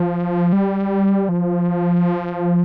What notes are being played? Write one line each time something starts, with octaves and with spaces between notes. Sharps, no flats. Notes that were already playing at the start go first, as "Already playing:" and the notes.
Already playing: F3
G3
F3